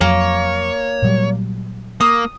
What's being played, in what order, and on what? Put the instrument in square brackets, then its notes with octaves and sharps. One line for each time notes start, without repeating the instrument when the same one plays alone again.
[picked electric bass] F2 F#3 [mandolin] A#3 [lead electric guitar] C#5
[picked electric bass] A#2 F#3 G3
[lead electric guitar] A#3 [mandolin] D#6